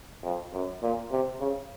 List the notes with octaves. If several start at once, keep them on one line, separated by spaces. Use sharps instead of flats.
F2
F#2
A#2
C3
C#3